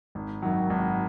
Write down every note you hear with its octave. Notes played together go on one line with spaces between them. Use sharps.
G#1
F#2 D#3 F#3
G#1